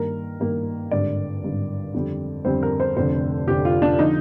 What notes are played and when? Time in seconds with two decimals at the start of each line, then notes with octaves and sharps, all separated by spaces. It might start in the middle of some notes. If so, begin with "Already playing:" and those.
Already playing: G2 D#3 A#3 A#4
0.40 G2 D#3 A#3
0.91 G#1 G2 D3 D5
1.43 G#1 G2 D3
1.94 F2 D3 G3 C4
2.45 F2 D3 G3 C4 C5
2.63 A#4
2.80 C5
2.97 F1 F2 D3 C5
3.47 F1 F2 D3 G4
3.65 F4
3.82 D4
3.99 D3 F3 D#4